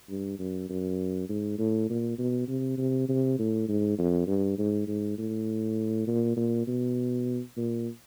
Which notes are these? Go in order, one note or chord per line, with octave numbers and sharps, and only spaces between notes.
G2
F#2
F#2
G#2
A2
A#2
B2
C3
C3
C3
A2
G#2
F2
G2
G#2
G#2
A2
A#2
A#2
B2
A#2